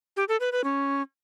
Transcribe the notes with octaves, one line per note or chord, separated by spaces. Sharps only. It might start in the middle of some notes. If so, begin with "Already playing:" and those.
G4
A4
B4
B4
C#4